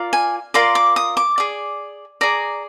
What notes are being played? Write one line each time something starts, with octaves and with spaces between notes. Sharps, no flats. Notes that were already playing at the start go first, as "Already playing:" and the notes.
Already playing: F4 A#4 D5
G#5
F4 A#4 D5 C6
D6
D#6
D6
G#4 D5
G#4 D5 A#5